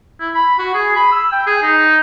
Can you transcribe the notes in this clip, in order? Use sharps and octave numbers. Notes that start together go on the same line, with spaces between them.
E4
B5
F#4
G#4
B5
E6
G5
G#4
D#4